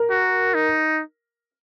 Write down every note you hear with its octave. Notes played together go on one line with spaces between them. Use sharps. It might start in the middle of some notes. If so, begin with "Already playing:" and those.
Already playing: A#4
F#4
D#4